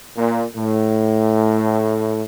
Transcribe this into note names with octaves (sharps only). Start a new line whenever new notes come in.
A#2
A2